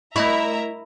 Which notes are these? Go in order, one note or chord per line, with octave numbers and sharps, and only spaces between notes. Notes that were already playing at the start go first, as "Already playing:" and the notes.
A3 E4 A#4 D#5 E5 A#5 C#6